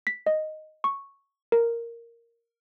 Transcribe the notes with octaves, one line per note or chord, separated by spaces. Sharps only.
B6
D#5
C#6
A#4